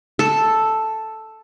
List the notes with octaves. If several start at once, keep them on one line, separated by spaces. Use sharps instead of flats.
A4